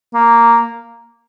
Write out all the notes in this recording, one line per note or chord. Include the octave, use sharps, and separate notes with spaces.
A#3